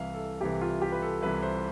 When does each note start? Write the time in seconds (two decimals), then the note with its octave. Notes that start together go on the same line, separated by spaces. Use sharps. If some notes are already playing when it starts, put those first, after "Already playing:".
Already playing: C2 C3 E3 E5 F5
0.14 A4
0.41 C2 C3 E3 G4
0.61 F4
0.82 G4
0.92 B4
1.02 A4
1.22 C2 C3 E3 B4
1.42 C5